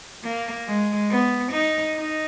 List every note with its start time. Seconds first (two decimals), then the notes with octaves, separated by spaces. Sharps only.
0.24 A#3
0.67 G#3
1.11 B3
1.53 D#4
1.96 D#4